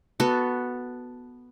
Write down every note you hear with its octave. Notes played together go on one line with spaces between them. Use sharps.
B3 F#4 A4